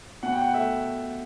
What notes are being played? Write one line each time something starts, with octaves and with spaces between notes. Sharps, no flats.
B2 F#5
G5
F#5
A3 E5